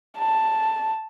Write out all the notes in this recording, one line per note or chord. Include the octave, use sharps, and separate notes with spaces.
A5